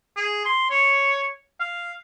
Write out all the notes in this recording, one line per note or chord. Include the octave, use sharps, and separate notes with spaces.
G#4
C6
C#5
F5